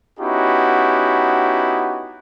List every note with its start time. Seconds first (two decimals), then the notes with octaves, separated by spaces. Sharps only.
0.20 B3 C#4 D#4 E4 F#4 G4